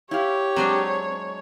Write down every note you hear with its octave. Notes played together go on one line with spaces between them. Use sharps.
E4 G4 C#5 F5
F#3 G#3 C4 D4